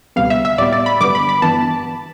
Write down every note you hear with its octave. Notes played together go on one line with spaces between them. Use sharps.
D2 C3 G3 B3 F5
E5
E5
A2 G3 B3 D5
D5
B5
G2 D3 G3 B3 D6
B5
B5
G2 E3 B3 A5